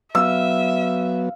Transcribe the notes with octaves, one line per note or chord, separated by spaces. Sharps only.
F#3 B3 E5 F5 E6